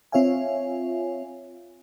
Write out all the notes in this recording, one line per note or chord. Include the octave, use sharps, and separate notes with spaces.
C4 F4 C#5 E5 F5 G#5